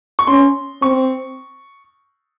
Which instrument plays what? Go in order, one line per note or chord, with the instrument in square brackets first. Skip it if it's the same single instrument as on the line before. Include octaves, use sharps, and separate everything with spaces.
[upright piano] C#6
[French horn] C#4 [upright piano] C6
[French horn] C4 [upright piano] C#6